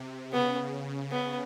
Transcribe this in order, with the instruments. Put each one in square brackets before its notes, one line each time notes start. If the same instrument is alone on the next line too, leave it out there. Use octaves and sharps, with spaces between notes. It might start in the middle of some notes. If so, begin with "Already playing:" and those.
Already playing: [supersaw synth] C3
[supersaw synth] C#3 [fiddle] B3
[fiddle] B3